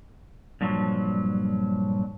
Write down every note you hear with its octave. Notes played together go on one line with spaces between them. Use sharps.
G2 A#2 F3 F#3